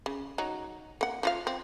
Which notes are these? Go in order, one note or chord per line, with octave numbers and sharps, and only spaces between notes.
C#3
F#3 D#4
A#3 F#5
F3 F4 F5
C4